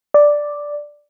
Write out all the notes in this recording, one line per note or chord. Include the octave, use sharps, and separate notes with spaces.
D5